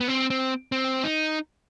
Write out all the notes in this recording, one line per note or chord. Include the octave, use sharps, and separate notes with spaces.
B3
C4
C4
C4
D#4